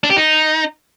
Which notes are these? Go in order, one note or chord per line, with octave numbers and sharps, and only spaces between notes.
D4
G4
D#4